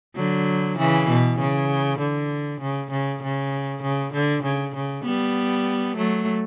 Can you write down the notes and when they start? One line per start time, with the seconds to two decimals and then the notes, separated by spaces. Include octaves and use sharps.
0.16 D3 F#3
0.78 C#3 E3
1.08 B2
1.39 C#3
1.99 D3
2.61 C#3
2.91 C#3
3.22 C#3
3.83 C#3
4.13 D3
4.43 C#3
4.75 C#3
5.05 G3 B3
5.97 F#3 A3